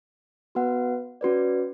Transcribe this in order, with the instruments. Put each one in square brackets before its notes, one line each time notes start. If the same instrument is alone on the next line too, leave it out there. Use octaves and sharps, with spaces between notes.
[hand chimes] B3 F#4 B4 F#5
C#4 F#4 B4 D5